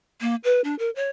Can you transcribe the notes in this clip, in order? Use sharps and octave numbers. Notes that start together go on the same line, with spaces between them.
A#3
B4
D4
A#4
C#5